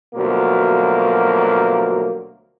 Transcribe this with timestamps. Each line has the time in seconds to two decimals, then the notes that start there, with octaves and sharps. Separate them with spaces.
0.14 D2 B2 F3 F#3 A#3